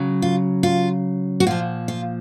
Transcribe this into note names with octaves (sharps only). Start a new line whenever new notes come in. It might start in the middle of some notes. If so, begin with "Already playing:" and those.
Already playing: C#3 F#3
F4
F4
F#4
A#2 F3 F4
F4